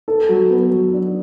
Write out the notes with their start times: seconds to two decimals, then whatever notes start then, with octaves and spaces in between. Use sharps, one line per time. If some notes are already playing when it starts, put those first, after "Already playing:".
0.08 A4
0.29 F#3
0.50 B3
0.71 F#3
0.93 D4